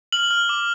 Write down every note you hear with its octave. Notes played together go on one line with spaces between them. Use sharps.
F6 F#7
F6
D6